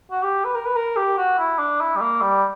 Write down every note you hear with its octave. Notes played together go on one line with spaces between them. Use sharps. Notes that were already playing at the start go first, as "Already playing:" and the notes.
F#4
G4
B4
A#4
B4
A#4
G4
F#4
E4
D4
E4
G3
A#3
G3